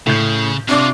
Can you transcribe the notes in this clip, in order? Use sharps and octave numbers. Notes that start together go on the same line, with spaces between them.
A2 C#3 G6
C3 D4 F4 F#4 D6